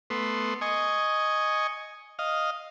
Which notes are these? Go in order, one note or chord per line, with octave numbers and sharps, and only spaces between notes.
A3 B3 C6
D#5 G#5 C#6
D#5 F5